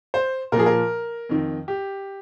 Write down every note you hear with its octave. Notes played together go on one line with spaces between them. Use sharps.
C5
A#2 F3 G#4 A#4
A#4
F2 D#3
G4